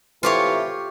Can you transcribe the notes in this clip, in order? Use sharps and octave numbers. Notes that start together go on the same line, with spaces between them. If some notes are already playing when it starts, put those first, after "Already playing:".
A2 C3 E3 F4 G4 C#5